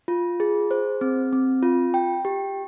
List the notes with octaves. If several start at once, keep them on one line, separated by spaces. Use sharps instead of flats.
F4
G#4
C5
C4
C4
F4
G5
G4